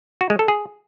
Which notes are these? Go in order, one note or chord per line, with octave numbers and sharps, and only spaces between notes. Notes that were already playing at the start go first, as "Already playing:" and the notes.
F#4
G#3
A4
G#4